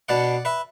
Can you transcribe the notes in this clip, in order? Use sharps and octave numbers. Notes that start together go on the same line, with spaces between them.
B2 B3 D4 D5 F#5
B4 E5